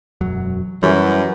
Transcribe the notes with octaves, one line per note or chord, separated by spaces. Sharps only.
E1 F#2 F#3
F#2 E3 G3